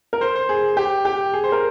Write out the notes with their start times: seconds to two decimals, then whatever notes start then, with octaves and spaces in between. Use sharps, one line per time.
0.13 A#4
0.21 C5
0.35 C5
0.49 G#4
0.77 G4
1.05 G4
1.34 G#4
1.44 C5
1.52 A#4